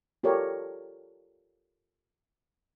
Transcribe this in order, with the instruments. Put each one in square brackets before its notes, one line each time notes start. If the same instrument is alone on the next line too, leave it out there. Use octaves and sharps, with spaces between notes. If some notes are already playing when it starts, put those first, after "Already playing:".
[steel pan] F4 G4 A4 A#4 C#5 D5